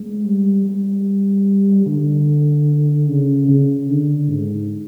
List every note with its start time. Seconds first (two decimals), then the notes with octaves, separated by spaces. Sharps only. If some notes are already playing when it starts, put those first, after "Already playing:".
Already playing: G#3
0.24 G3
0.65 G3
1.86 D3
3.08 C#3
3.48 C#3
3.89 D3
4.30 G#2